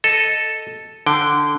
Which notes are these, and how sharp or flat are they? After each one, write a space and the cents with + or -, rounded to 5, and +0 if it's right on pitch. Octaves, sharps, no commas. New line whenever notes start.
A4 +0 D#5 +0
D3 +0 G5 -10